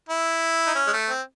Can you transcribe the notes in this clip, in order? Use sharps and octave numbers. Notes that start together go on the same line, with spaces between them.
E4
D#4
C#4
G#3
A3
C4